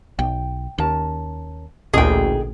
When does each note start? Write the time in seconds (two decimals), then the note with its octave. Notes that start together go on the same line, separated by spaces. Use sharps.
0.19 B1 G5
0.78 D#2 C#4 A#4 A5
1.93 A1 D2 A#2 G#4 A#4 D#5 G5